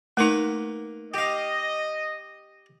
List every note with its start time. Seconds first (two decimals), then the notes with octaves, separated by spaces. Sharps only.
0.17 A3 A#3 D#4 B4 A#5
1.14 G4 D#5 F5